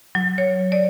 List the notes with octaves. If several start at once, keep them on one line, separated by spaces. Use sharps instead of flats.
F#3
C#5
D5